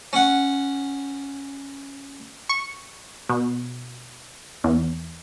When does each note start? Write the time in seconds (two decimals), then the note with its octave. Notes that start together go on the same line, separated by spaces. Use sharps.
0.13 C#4 F#5
2.49 C#6
3.29 B2
4.64 E2